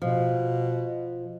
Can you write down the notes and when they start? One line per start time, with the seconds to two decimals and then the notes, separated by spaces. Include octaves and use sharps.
0.02 B2 F3